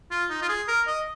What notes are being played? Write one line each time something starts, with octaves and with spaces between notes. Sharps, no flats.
F4
D#4
F4
G#4
A#4
D#5